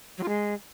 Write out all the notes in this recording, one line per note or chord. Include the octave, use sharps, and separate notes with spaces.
F#3
F4
G#3